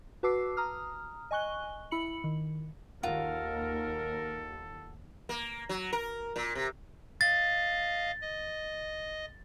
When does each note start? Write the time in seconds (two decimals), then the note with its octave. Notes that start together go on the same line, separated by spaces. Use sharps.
0.23 F#4 B4 A5 D6 E6 C7
0.57 A#5 D#6 F6
1.31 D#5 G#5 C#6 F#6 G7
1.91 E4 B5 C#7 F#7
2.24 D#3
3.03 D#2 F4 F#4 A4 A#4
5.29 A#3
5.69 F#3
5.93 A#4
6.36 A#2
6.55 C3
7.21 D#5 F5 A6
8.21 D#5